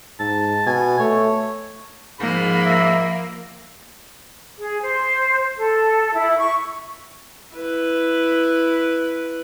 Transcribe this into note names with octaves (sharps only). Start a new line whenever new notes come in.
G#2 A5
B2 G#5
A3 C#5
G#2 F3 A#3 B5
E5
G#4
C5
A4
E4
C#6
E4 B4